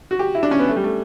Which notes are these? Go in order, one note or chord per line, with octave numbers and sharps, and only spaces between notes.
F#4
G4
E4
D4
C#4
B3
A3
G3
A3